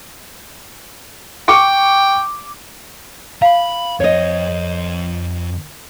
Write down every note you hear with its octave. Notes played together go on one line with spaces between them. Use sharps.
G5 C#6 D6 C#7
F5 A#5 B5
F2 C5 C#5 D#5